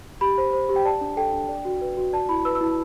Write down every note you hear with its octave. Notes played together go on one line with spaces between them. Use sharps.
G4 B5
C5
C5
G4
G5
D5 A5
D4
A4 G5
D4
D5
F#4
B4
F#4
D5 A5
E4 B5
B4 E6
E6
E4